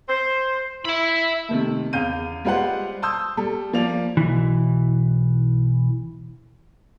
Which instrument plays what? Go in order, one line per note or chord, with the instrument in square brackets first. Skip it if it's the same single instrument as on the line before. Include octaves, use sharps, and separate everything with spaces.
[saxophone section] C5
[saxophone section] E4 [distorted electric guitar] E5 B5
[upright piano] C3 D#3 A3
E2 C#3 F5 G6 D#7
G3 G#3 F4 B4 C5 F#5
A5 C6 D#6 E6 G6
G3 A4
F3 A#3 D5 F7
[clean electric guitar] B1 E3